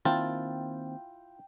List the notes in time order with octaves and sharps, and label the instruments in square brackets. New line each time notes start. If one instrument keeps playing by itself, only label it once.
[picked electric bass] D#3 A#3 C4 [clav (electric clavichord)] E4 F4 A5 [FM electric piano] G5